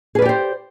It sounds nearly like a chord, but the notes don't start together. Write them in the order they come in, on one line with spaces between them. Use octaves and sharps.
G#4 B4 D5 G4 C5